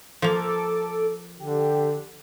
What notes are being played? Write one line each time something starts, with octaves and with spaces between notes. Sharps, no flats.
F3 A#3 A4 D6
D3 G4